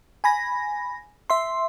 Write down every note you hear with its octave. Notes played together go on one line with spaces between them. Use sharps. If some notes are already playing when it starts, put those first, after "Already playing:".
G#5 B5 A#6
E5 C6